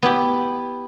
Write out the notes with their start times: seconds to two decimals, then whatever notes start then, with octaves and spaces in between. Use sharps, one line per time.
0.03 B3 E4 G4